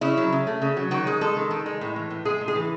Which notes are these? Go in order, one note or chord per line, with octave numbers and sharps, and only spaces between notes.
C#3 E4
F#3
C#3
A3
C#3
F#3
D#3 F#4
G#3 G#4
G#3 A4
D#3
D#3
G#3
A2
E3
A2
G#3 G#4
A2
G#4
E3